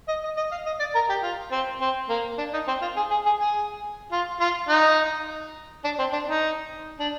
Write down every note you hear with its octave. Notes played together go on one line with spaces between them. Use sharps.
D#5
D#5
D#5
F5
D#5
D5
A#4
G4
F4
C4
C4
A#3
D4
D#4
C4
F4
G#4
G#4
G#4
G#4
F4
F4
D#4
D4
C4
D4
D#4
D4